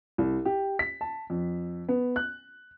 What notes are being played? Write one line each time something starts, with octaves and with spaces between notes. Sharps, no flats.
C2
G4
B6
A5
F2
B3
F#6